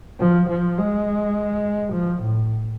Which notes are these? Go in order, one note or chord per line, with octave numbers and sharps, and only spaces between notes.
F3
F3
G#3
F3
A2